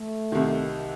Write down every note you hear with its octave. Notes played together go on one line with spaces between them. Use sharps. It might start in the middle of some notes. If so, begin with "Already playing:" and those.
Already playing: A3
C2 C3 D#3